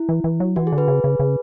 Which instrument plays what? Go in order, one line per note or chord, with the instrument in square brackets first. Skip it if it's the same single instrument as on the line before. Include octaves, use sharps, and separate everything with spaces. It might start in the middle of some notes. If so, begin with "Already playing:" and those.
Already playing: [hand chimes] E4
[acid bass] E3
E3
F#3
[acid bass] E3 [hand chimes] F#4
[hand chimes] G#4
[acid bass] D3
[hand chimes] G#4 B4
[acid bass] C#3
C#3
C#3